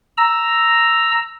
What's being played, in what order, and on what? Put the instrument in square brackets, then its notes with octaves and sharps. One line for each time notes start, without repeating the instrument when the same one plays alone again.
[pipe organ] A#5 E6